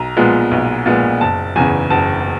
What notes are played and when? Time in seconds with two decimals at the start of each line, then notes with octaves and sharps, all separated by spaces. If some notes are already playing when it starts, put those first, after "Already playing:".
Already playing: B1 A#5
0.17 A#2 F3 G#3 B3
0.51 B1
0.86 A#2 F3 G#3 B3
1.21 F#1 A5
1.56 E2 C#3 G#5
1.90 F#1 A5